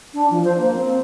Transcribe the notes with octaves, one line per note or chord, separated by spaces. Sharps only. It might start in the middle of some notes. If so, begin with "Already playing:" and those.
D4
F3
C5
A#3
C4